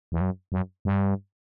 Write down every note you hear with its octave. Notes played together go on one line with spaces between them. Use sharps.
E2
F#2
F#2
G2